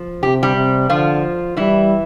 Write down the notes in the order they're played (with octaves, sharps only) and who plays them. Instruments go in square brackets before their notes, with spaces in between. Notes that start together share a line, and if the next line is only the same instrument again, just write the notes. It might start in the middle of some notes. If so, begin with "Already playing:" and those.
Already playing: [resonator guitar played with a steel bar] F3
[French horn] C3 [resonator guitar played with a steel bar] G4
[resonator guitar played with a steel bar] G3 G4
[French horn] C3
[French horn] D3 [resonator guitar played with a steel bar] F3 F4
[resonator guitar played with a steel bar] E3 E4 [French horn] G3